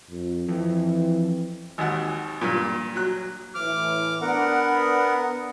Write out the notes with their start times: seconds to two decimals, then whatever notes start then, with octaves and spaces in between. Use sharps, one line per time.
0.10 F2
0.49 F2 E3
1.78 G#1 D#2 F#5
2.41 G2 A#2
2.96 F#3 F#6
3.55 A2 E3 D6 F6
4.22 B3 D4 A#4 F#5